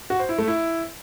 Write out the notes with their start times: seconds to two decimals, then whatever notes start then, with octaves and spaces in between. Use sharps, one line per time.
0.10 F#4
0.20 C5
0.29 E4
0.38 A3
0.48 E4